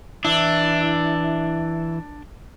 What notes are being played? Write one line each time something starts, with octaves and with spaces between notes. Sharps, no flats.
E3 D4 E4